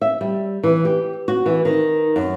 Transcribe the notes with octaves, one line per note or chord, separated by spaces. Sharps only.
E5
G3
E3
G4
F#4
E3
D#3
F#2